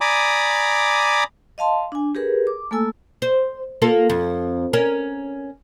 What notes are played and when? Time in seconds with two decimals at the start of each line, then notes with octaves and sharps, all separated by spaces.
0.01 D5 G#5 A#5 B5 D6 D#6
1.58 D#5 F5 A5 C6
1.92 D4 G#5
2.15 G4 G#4 A#4 B4
2.47 D6
2.71 A3 A#3 A4 G#5 E6
3.22 C5
3.82 A#3 F4 A4
4.10 F2
4.73 C#4 A#4